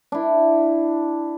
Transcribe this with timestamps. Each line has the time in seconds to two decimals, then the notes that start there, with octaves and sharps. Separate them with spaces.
0.12 D4 E4